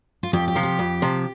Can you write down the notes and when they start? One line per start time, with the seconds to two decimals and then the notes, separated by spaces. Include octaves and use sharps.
0.23 F4
0.33 F2 G4
0.48 G4
0.55 C3 F3
0.63 G4
0.79 F2
1.02 C3 F3